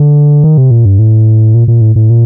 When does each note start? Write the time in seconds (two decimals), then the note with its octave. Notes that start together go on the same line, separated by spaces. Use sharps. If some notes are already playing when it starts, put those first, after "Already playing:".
Already playing: D3
0.44 D#3
0.58 C3
0.71 A#2
0.85 G2
0.99 A2
1.54 A#2
1.68 A#2
1.81 A2
1.96 A2
2.10 A#2